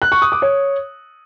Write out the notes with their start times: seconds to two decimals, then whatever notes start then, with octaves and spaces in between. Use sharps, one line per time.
0.02 F#6
0.12 C#6
0.22 D#6
0.32 D6
0.42 C#5